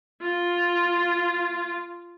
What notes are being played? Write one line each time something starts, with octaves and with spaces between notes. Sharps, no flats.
F4